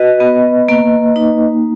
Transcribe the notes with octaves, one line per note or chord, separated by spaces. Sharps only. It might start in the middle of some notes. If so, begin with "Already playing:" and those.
Already playing: F#4 B4 D#5
B3
A#3
D#4